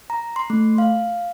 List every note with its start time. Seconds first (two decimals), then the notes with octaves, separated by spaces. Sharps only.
0.10 A#5
0.36 C6
0.50 A3
0.78 F5